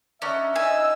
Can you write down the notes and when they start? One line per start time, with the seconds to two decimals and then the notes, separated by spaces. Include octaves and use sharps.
0.22 C#4 D4 E5 F#5 A#5
0.56 D#4 G#5 E6